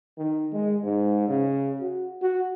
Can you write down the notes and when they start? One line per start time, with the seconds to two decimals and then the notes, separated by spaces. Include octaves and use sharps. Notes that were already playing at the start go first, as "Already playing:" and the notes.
0.18 D#3
0.53 G#3
0.83 G#2
1.29 C#3
1.81 F#4
2.22 F#4